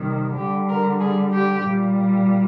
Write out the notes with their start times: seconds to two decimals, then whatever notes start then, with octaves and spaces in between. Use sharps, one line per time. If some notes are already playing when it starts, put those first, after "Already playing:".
Already playing: C3 D#3 G3
0.36 D3 G3 G4
0.69 A#4
1.00 G#4
1.32 G4
1.63 A#2 G3